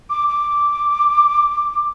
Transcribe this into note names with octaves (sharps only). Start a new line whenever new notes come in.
D6
D6